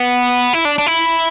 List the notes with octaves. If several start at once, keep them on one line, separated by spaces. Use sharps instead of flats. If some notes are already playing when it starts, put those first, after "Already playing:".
Already playing: B3
E4
D4
D4
E4